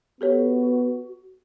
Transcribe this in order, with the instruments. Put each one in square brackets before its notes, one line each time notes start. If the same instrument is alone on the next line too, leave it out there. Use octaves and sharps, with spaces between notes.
[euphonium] B3 [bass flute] F#4 [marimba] G4 A4 C#5